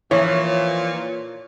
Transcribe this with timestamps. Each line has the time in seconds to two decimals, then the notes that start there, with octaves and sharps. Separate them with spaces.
0.11 A#2 E3 F3 C#5